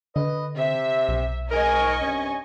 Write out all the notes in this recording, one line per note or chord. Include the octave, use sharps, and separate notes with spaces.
D3 B4 D#5
C3 E5
B1
G#2 A#4 D#5 G#5 C#6
G2 C3 C#4